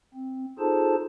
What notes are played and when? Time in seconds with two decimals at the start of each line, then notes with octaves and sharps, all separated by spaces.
0.14 C4
0.59 D#4 F4 G#4 A4 C5 A5